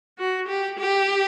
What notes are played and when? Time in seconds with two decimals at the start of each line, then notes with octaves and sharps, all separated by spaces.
0.19 F#4
0.48 G4
0.78 G4